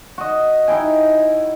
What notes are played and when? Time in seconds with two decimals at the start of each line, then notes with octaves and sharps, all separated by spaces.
0.18 F#4 D#5
0.68 D#4 E4 G5 G#5